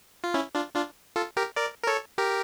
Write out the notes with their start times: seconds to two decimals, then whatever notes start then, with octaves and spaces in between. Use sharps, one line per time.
0.24 F4
0.34 C#4 E4
0.55 D4 F4
0.75 D4 F4
1.16 F4 A4
1.37 G4 A#4
1.56 A#4 D5
1.83 A#4
1.87 A4 C#5
2.18 G4 A#4